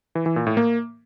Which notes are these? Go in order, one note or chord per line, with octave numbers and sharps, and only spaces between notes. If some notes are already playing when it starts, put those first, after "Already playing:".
E3
E3
A#2
A2
A#3